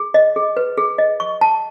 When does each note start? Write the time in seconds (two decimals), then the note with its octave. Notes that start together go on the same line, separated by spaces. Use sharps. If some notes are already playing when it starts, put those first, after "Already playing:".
Already playing: G#4
0.14 D#5
0.36 G#4
0.57 B4
0.77 G#4
0.98 D#5
1.20 C#6
1.41 A5